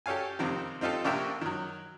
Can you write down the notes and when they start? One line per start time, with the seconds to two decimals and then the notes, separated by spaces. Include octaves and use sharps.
0.06 G4 A4 C#5 F5 G#5
0.39 F2 C3 D#3 C4
0.81 C4 D#4 F4 G4 A4
1.05 A#1 C3 D4 A#4 E5 G5
1.41 D#3 F#3